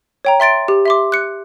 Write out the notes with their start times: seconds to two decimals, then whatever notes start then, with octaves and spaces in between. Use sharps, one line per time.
0.25 C#5 G5 A#5
0.40 E5 C6 A6 D7
0.68 G4
0.86 E5 C6 D6
1.12 F#6 C#7